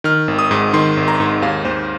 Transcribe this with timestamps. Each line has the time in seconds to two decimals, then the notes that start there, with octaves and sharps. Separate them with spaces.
0.04 D#3 F6
0.28 G#1
0.39 D#6
0.51 G#2
0.73 D#3 C6
0.97 G#1
1.08 A#5
1.20 G#2
1.42 D#2 F5
1.65 D#2 C5